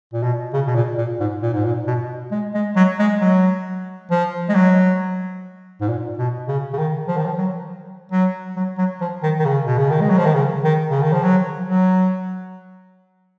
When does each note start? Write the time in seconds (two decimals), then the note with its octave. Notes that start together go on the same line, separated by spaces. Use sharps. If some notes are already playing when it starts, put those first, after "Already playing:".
0.13 A#2
0.23 B2
0.54 C#3
0.67 B2
0.75 A#2
0.98 A#2
1.20 G#2
1.43 A#2
1.54 G#2
1.65 A#2
1.87 B2
2.31 G#3
2.54 G#3
2.76 F#3
2.99 G#3
3.21 F#3
4.11 F3
4.49 G#3
4.55 F#3
5.81 G#2
5.88 A#2
6.18 B2
6.48 C#3
6.73 C#3
6.78 D#3
7.08 F3
7.17 D#3
7.26 F3
7.38 F#3
8.12 F#3
8.56 F#3
8.78 F#3
9.01 F3
9.23 D#3
9.40 D#3
9.45 C#3
9.66 B2
9.78 C#3
9.90 D#3
10.01 G#3
10.10 F#3
10.18 F3
10.26 D#3
10.34 C#3
10.64 D#3
10.90 C#3
11.02 D#3
11.13 F3
11.23 F#3
11.68 F#3